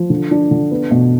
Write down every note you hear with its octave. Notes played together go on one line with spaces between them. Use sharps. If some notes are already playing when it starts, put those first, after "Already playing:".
Already playing: F3
D3
D4
D3
B3
B2